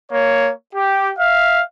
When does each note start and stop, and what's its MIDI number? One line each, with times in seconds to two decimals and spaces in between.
0.11 0.50 58
0.11 0.50 73
0.74 1.12 67
1.19 1.62 76
1.19 1.62 77